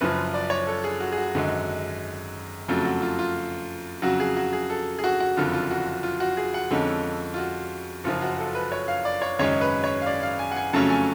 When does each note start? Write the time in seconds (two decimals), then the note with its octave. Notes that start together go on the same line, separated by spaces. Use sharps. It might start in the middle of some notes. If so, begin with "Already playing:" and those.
0.01 F#1 F#2 F3 B4
0.34 D5
0.50 C#5
0.67 A4
0.84 G#4
1.00 F#4
1.12 G#4
1.18 F#4
1.34 G#1 F#2 D3 G#3
2.68 F2 C#3 F#3 A3 F4
2.85 F#4
3.02 F4
3.19 F4
4.02 F2 C#3 F#3 F#4
4.20 G#4
4.36 F#4
4.53 G#4
4.70 A4
4.99 G#4
5.04 F#4
5.20 F#4
5.37 F#1 F2 D3 F4
5.53 F4
5.70 F#4
6.03 F4
6.20 F#4
6.37 G#4
6.54 F#5
6.71 F2 D3 G#3 C#4 A4
7.34 F4
7.38 F#4
8.04 F#1 F#2 F3 F4
8.22 F#4
8.38 A4
8.55 B4
8.72 C#5
8.88 F5
9.05 D5
9.22 C#5
9.39 G#1 F#2 C#3 G#3 C#4 C#5
9.61 B4
9.84 C#5
10.01 F5
10.06 D5
10.23 F5
10.39 G#5
10.51 F#5
10.56 G#5
10.73 F2 C#3 F#3 A3 C#4 A5
10.90 G#5